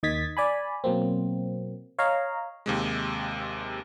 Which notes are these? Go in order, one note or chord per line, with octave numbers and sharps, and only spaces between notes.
D#2 D#3 D#5 G#6 A6 B6
D5 G#5 B5
B2 F#3 A#3 C4
C#5 D#5 F5 A#5
D#2 C3 G#3